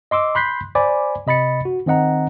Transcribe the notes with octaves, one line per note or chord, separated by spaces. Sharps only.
D#5 C6 D6 E6
B5 C6 F#6 G6 B6 C7
C5 D5 G#5 B5 D6
C3 D#5 B5 A6 C#7
F#4
D#3 C4 D#5 F#5 A#5